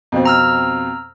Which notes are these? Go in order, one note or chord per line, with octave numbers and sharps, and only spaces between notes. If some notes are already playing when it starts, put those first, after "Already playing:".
F2 B2 C4
A#5 E6 F6